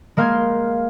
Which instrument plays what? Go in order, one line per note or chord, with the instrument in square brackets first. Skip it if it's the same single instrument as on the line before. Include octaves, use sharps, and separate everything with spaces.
[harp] G#3 A#3 F5 C6 G6 G#6